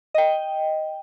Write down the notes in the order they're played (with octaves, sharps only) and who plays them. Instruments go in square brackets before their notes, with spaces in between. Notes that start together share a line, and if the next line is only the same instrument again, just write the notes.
[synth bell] D#5 G5